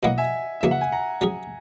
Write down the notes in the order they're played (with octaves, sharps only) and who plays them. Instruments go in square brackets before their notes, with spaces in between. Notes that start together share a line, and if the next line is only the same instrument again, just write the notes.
[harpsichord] B2 F#3 A#3 E4 [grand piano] D#5 F#5
[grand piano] E5 G#5
[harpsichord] C#3 E3 A#3 D#4 F#4 [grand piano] E5
[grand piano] F#5
G#5
F#5 A#5
[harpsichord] F#3 C#4 G#4